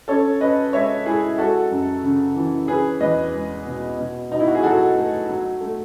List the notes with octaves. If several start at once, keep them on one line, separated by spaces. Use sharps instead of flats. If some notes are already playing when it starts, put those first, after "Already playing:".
C#4 A4 C#5
C#4 B4 D#5
G#3 C#5 E5
G#3 E4 G#4
G#3 F#4 A4
F#2
C#3
E3
C#4 G#4 B4
E2 B4 D#5
G#3
B2
B2
B2 D#4
E4
F#4
G#4
F#3 F#4 A4
A3
F#3
A3